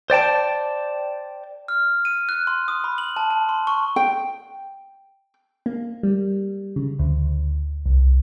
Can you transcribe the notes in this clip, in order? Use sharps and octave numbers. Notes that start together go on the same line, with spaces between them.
C5 D5 G5 A5
F6
D#7
F#6
C6
D#6
B5
F#7
A5
A5
C6
C#6
G5
A#3
G3
C#3
D2
C2